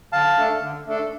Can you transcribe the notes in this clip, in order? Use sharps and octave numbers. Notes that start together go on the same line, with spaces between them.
D3 F5 A5
A3 D4 A4
D3
A3 D4 A4